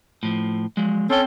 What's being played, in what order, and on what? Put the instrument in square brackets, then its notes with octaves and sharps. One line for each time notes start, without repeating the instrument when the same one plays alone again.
[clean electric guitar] A2 F3
F3 F#3 G#3
[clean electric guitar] C4 G5 [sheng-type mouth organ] C#4 A4